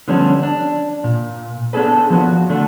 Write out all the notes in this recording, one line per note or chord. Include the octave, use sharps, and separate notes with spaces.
D3 F3 G3 B3 C#4 D4
D4
A#2
B3 D4 G#4 A4 B4
F3 B3 F#4
D3 A3 D4